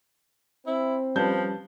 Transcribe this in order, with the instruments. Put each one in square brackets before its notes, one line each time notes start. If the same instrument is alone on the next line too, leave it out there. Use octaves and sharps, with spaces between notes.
[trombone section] C4 [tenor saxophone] E4
[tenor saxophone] F3 [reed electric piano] G3 C#4 [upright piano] B4 A5 G6